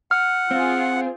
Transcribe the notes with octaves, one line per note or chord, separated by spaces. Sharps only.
F#5 F6
C4 F4 G#4